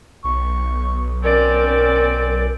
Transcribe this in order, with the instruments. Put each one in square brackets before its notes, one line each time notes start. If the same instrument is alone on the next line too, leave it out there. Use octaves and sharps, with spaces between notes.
[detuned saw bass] B1 [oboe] C#6
[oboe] C4 [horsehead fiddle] C#4 D5 [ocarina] A#4